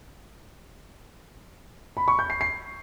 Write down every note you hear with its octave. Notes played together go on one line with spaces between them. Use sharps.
B5
C#6
G6
C7
C7